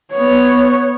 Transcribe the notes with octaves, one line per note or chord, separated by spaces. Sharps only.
B3 C#5